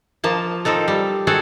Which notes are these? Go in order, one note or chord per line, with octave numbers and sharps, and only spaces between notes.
F3 A#3 A5
F3 C4 D#4 A4
G3
C4 F#4 G#4 A4